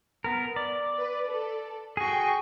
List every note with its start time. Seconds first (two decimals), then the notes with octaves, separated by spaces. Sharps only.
0.24 B3 A#4
0.56 D5
0.97 B4
1.29 A4
1.97 F#4 G#4 G5 C#6